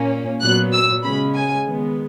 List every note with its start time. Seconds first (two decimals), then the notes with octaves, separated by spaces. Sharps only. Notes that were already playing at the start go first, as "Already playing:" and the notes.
Already playing: A#2 A#3 C#4
0.42 A#2 F#3 B3 F#6
0.72 E6
1.03 C#3 G#3 C#4 B5
1.34 G#5
1.65 D#3 G#3 B3